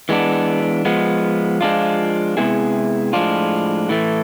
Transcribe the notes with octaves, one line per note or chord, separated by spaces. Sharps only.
E3 G#3 B3 D4
F3 G#3 B3
F3 G#3 B3 D4 F4
C3 G#3 B3 E4 G#4
A2 F3 G#3 D4 F4
A2 E3 A3